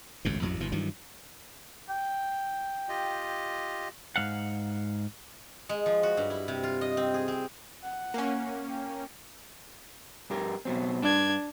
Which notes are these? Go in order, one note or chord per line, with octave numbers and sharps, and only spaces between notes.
G#1 C#2 F#2 A2
A1 F2 F#3
G1 B2 E3
G2 D#3 E3 F#3
G5
F4 G4 D#5
G#2 G#3 F5 F#5
G#3
F3
F#4
G2
E4
C3
F4
D#5
C4
G#4
C4
F#5
A#3 C#4
G5
G2 G4 A#4
B2 F#3 C4
G2 D4 G#6